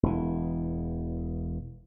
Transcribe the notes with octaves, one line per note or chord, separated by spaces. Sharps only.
E1 E3